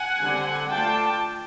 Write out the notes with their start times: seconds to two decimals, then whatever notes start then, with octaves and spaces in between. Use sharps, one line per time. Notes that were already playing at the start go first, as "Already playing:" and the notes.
Already playing: F#5 G#5
0.20 D3 G3 C4
0.69 A3 D4 F4 G5 A5